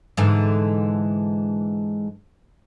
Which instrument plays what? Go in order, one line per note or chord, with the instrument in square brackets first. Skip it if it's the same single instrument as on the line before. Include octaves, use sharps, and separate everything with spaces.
[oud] G#2 D3 E3